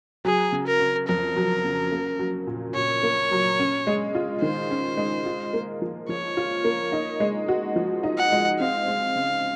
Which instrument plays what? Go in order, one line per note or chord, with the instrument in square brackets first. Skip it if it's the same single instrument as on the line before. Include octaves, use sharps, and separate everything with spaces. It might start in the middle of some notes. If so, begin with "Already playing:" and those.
[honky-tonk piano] F#3 [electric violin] G#4
[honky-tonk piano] C#3
[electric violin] A#4
[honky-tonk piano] C#4
[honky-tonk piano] F2 [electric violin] A#4
[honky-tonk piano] F#3
C#3
A#3
F#3
A#2
[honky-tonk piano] A#2 [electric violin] C#5
[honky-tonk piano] A#3
F#3
C#4
G#3
F4
[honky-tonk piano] D#3 [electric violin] C5
[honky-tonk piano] C#4
G#3
F4
A#3
F3
[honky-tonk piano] F3 [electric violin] C#5
[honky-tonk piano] F4
A#3
D#4
G#3
F#4
F3
D#4
[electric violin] F#5
[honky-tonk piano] G#3
[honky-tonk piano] C4 [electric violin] F5
[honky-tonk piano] G#3
C#3